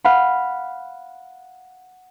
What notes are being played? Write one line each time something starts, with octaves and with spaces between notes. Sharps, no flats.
F5 F#5 B5